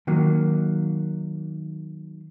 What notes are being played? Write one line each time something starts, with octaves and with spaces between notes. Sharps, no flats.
D#3 F#3 A#3